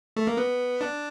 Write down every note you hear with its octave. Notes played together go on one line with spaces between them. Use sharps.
A3
A#3
B3
D4